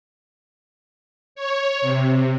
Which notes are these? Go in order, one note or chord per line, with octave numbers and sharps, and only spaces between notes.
C#5
C3